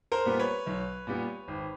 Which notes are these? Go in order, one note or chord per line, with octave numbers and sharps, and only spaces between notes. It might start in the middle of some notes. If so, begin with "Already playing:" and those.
A#4 C5
A#2 G3 B3
B4 C#5
B1
A#2 G3 B3
G#1